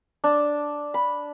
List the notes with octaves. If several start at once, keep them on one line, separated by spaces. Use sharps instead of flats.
D4
B5